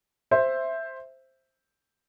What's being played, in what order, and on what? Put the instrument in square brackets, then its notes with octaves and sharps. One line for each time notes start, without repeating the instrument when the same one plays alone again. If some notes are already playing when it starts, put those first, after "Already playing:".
[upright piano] C5 E5